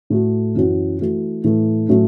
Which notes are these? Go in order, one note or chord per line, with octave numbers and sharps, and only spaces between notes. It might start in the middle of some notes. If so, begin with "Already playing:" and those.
A2 A3 F#4
F#2 E3 C#4 F#4
E3 A3 F#4
A2 E3 A3
A2 F#3 A3 C#4 F#4